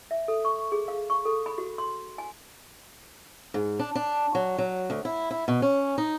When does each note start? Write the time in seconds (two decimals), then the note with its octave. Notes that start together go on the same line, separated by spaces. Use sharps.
0.11 E5
0.28 A4
0.45 C#6
0.72 G#4
0.88 F5
1.10 C#6
1.25 A4
1.46 B5
1.58 F#4
1.78 C6
2.18 G#5
3.54 G#2
3.79 D4
3.95 D4
4.35 F#3
4.58 F#3
4.90 D2
5.05 E4
5.31 E4
5.48 B2
5.62 C#4
5.98 D#4